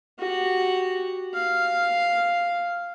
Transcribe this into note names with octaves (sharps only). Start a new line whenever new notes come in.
F#4 G4
F5